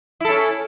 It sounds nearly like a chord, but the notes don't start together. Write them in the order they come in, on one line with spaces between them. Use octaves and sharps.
E4 A4 C#4